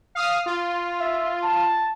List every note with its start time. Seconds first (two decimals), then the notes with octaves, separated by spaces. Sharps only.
0.15 F5 D#6 F6
0.46 F4
1.00 E5
1.44 A5